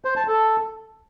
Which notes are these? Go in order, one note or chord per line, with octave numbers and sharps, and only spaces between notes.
C5
A5
A4